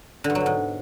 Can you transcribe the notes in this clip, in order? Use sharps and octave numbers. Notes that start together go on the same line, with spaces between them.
D3
G2
F#3
B2
G#2